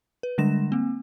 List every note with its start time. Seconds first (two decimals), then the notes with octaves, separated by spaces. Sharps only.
0.23 B4
0.38 D3 G3 G#3 D4 A#6 E7
0.72 A#3 C4